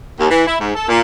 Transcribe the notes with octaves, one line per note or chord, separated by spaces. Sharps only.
D#2
E3
E4
G#2
A4
A#2